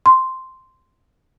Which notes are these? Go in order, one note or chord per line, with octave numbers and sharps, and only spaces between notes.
C6